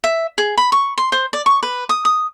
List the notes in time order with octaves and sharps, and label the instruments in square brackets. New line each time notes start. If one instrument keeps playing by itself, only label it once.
[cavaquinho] E5
G#4
B5
C#6
C6
C5
D5
C#6
B4
D#6
D#6